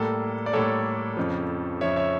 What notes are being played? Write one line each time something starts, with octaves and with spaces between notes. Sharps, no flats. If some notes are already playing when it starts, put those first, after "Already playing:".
Already playing: A2 G3 A#3 A4
D5
A2 G3 A#3 A4 C#5
F2 C#3 F3
F2 C#3 F3 C#5 E5
C#5 E5